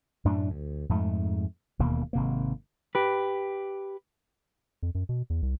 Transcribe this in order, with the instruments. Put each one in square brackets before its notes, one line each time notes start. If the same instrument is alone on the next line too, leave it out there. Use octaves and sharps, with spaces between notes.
[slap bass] F#2 A2 A3 D4
D2
F2 G#2 A3
E1 D#2 B2 A#3
G#1 C3 A#3
[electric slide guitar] G4 B4
[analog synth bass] F2
F#2
B2
E2
C2